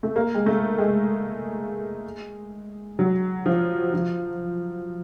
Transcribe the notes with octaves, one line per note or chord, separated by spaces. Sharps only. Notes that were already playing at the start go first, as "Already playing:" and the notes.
A3
A#3
G#3
A3
G#3
F#3
F3
F3